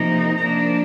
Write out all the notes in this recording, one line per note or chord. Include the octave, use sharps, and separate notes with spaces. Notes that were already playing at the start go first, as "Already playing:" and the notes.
Already playing: C3 F3 A#3 D#4
F3 A#3 D4 A#5